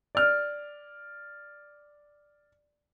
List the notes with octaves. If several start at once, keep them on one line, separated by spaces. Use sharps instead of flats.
D5 F6